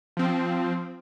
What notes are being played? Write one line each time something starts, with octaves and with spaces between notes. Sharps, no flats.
F3 C4